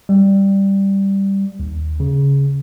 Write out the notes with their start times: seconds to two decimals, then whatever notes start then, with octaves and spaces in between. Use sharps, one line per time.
0.09 G3
1.60 D#2
2.00 C#3